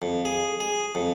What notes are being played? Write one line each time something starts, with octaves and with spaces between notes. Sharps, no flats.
F2
G#4
G#4
F2